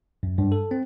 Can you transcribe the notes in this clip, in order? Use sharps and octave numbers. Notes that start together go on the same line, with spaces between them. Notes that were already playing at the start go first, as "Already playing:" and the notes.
F#2
G2
A4
C4